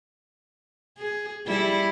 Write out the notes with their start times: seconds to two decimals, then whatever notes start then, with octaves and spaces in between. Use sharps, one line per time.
0.98 G#4
1.47 G3 E4